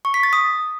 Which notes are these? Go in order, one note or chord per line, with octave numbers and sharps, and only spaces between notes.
C#6
B6
A6
D#6